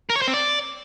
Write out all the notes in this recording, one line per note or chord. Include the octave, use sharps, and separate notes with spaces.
A#4
C#5
C5
C4
D5